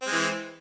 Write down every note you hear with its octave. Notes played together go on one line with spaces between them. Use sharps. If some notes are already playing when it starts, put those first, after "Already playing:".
E3 G#3 C4